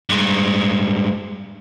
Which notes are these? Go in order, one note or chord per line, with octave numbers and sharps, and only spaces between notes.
G2 G#3